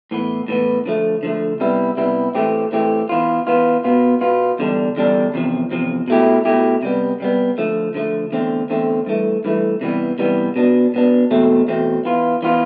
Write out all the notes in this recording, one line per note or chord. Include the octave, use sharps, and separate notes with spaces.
A2 E3 B3
A2 E3 B3
D3 F3 A3
D3 F3 A3
C3 G3 B3 E4
C3 G3 B3 E4
A2 E3 A3 C4 G4
A2 E3 A3 C4 G4
E3 B3 F4
E3 B3 F4
B2 B3 F4
B2 B3 F4
E2 D3 G3 D4
E2 D3 G3 D4
E2 C3 F3
E2 C3 F3
B2 A3 E4 G4
B2 A3 E4 G4
C3 G3 B3
C3 G3 B3
D3 F3 A3
D3 F3 A3
E2 D3 A3 C4
E2 D3 A3 C4
G2 E3 A3
G2 E3 A3
C3 E3 G3 B3
C3 E3 G3 B3
B2 B3 D4
B2 B3 D4
E2 B2 A3 C4
E2 B2 A3 C4
E3 B3 F4
E3 B3 F4